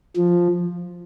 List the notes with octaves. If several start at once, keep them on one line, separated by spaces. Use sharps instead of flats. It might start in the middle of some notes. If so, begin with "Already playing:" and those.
F3